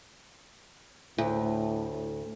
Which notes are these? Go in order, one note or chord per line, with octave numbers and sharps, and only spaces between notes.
D2 A2